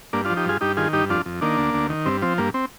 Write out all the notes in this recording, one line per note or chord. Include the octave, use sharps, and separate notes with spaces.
G2 A#3 D4
D4 F4
F3
D#4 G4
G2 F4 G#4
G2 D#4 G4
D#3 F4 G#4
G2 D#4 G4
F2 D4 F4
F2
D#3 A#3 D4
D2
D2
D#3
G2 C4
F3 C4
G2 A#3
C4